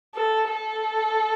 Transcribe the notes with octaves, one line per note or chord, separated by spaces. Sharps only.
A4
A4